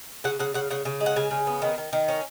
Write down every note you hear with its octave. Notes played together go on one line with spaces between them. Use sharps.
C#3 F#5
C#3 F#5
C#3 F#5
C#3 F#5
C#3
G#3
F#5
C#3 G#5
C#3
B3
D#3
D#3
D#3
C#4